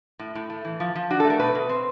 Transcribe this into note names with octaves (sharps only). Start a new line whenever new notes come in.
A2
A2
A3
E3
F3
F3
D4 F#4
A4
A3
A#4
B2 B4
B2
C4